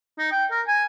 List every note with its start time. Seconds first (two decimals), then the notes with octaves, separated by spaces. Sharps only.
0.18 D#4
0.31 G5
0.51 A#4
0.67 G#5